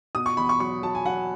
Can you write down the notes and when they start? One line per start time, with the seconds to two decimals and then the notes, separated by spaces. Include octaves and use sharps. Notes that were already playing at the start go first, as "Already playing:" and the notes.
0.15 B2 D#6
0.26 C#6
0.37 E2 B5
0.49 C#6
0.60 F#3 C#6
0.83 F#3 A5
0.95 G#5
1.05 F#3 F#5